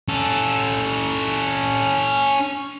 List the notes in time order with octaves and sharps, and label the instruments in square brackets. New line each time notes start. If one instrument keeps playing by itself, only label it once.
[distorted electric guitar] C#4 A4